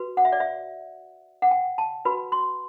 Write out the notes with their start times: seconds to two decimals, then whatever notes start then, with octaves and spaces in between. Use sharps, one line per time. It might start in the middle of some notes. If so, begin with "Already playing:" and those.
Already playing: F#4 B4
0.17 F#5
0.25 E5
0.32 D5
0.40 E5
1.42 F#5
1.51 G5
1.78 A5
2.05 F#4 B4 B5
2.32 C6